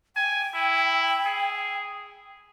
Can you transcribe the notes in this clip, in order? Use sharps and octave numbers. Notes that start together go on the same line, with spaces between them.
G5 G#5
E4
G#4